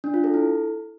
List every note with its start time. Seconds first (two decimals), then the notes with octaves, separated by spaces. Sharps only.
0.04 D4
0.14 F4
0.24 A4
0.34 E4